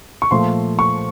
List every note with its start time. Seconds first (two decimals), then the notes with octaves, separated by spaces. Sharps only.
0.22 C#6
0.31 A#2 F3 A3 C6
0.79 C#6